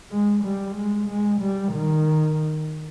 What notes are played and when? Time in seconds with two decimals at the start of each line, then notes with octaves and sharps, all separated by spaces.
0.11 G#3
0.44 G3
0.76 G#3
1.08 G#3
1.40 G3
1.72 D#3